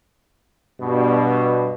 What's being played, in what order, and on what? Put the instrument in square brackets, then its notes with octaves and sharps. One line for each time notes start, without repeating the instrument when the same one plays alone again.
[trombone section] G2 B2